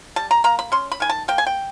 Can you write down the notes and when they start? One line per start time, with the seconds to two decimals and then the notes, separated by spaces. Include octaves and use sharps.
0.16 G3 A5
0.31 A#5
0.44 A#3 A#5
0.59 B5
0.72 C#4 C6
0.92 B5
1.00 D#3 G#5
1.10 A5
1.28 A#3 G5
1.38 G#5
1.47 G5